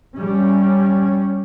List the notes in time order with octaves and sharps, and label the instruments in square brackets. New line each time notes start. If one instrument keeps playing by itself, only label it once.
[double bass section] G3 C#4